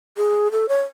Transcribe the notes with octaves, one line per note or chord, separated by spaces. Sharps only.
G#4
A4
C#5